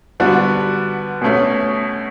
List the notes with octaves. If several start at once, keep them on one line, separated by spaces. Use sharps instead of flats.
D3 G3 B3 D4 F#4
B2 A3 C#4